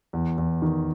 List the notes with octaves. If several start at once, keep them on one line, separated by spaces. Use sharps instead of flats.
E2
E2
D#3